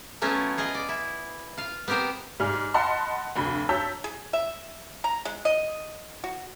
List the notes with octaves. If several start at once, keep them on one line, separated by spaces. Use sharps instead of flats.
F#3 A3 B3 C#4 E4 F4
F4 G#4 D#5 F5
D5
E4
F4 F5
B3 C4 G4 A#4 C5
G#2 G3 G#5 F6
D#5 F#5 A5 B5 C6
F1 D2 B5
C#5 A5 A#5 E6 G6 B6
G#4
E5
A#5
G#3
D#5
F#4